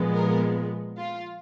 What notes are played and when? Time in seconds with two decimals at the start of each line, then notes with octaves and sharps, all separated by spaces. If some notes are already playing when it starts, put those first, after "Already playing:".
Already playing: A#2 F3 G#3 B3
0.14 A#4
0.99 F4